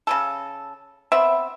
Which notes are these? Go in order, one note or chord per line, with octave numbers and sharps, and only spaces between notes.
C#3 F#3 A4
B3 C4 E5 B5